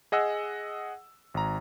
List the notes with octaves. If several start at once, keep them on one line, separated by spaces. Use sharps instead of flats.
G#4 D#5 F#5 E6
G#1 A#5